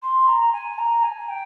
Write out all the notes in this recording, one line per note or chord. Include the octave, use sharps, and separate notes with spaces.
C6
A#5
G#5
A#5
G#5
G5